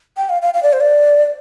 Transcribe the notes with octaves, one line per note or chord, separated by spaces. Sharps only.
G5
F5
F5
F5
D5
C5
D5